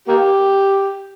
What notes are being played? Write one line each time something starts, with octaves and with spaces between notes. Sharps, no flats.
A#3 G4